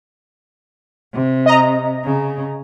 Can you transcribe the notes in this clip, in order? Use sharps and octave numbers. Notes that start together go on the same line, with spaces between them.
C3
D#5 A#5
C#3